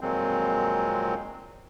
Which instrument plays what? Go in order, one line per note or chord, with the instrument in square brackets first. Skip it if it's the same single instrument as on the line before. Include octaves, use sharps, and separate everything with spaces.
[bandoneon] F2 A#2 D#3 F#3 G#3 C4